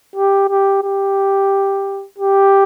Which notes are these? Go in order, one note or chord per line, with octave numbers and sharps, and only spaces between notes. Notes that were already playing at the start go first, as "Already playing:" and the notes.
G4
G4
G4
G4